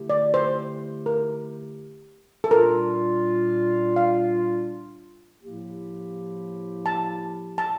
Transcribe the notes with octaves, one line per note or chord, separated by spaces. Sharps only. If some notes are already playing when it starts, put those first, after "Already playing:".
Already playing: D3 A3 E4 G4
D5
C5
A#4
A4
A#2 G3 D4 F4 A#4
F5
A2 F3 A#3 E4 G4
A5
A5